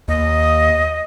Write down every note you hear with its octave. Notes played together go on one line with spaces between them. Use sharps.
D#2 D#5